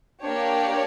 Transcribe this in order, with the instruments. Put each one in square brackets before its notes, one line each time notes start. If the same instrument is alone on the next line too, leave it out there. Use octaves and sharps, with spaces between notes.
[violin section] A#3 D4 G4 C#5